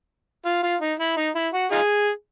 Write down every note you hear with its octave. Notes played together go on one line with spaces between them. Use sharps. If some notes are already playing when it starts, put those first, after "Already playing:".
F4
F4
D#4
E4
D#4
E4
F#4
D#4 F4 G#4